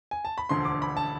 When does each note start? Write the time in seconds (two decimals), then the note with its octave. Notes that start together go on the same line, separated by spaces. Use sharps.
0.11 G#5
0.25 A5
0.38 B5
0.49 E1 D2 D3 F3 C6
0.65 D6
0.82 B5
0.97 A5